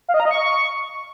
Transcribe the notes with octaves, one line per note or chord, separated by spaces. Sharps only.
F5
D#5
A#5
D#5
C#6